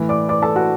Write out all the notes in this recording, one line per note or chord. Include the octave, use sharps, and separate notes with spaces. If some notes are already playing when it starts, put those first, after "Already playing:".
Already playing: A2 E3
D5 D6
D5 D6
A4 A5
F#4 F#5